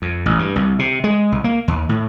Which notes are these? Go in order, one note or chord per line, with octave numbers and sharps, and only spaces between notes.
F2
A1
G2
C2
C3
G#3
C2
A#3
D#2
A2